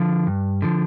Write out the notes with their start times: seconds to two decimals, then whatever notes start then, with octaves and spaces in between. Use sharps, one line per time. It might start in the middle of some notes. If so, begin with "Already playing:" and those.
Already playing: D3 F3
0.27 G2
0.62 D3 F3